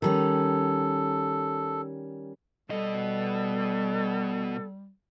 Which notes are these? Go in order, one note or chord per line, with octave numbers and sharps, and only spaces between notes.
D#3 G3 C#4 A4
B2 G3 A4 D#5